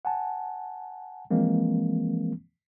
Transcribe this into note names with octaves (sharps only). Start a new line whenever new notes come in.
F#5 G#5 A5
E3 F3 G#3 A#3 C4